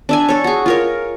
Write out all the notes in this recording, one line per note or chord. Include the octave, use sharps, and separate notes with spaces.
D4 E5 G#5
A4 C#5
F#4 G#4
F4 A#4 C#5